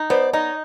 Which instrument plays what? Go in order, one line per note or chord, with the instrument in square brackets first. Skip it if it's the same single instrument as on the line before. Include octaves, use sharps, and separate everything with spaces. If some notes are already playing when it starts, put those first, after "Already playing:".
Already playing: [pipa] D#4
[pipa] B3 [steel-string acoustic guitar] C5 D5
[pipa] D#4 [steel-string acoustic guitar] C#5 D#5